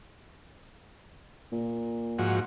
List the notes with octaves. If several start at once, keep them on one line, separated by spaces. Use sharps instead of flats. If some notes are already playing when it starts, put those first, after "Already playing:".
A#2
G#2 F3 F#4